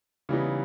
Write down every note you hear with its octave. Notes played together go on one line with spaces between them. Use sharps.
C#3 E3 G3 B3 D#4